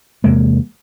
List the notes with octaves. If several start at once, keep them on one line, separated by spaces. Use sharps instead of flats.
E2 C3 G#3 A#3